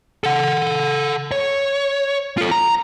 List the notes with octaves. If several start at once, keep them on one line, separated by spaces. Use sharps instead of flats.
A4 F#5
C#5
F4 A4
A#5